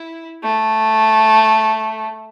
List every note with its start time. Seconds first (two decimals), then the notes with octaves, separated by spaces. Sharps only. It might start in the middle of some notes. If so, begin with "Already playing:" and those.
Already playing: E4
0.43 A3